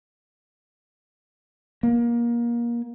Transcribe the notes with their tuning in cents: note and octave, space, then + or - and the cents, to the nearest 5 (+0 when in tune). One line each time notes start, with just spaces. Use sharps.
A#3 +25